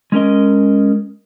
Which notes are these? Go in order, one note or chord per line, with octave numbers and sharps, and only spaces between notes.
G#3 C#4 A#4 D#5